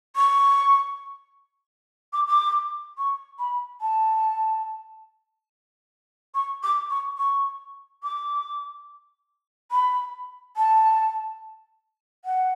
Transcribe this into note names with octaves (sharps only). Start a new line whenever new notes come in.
C#6
D6
D6
C#6
B5
A5
C#6
D6
C#6
C#6
D6
B5
A5
F#5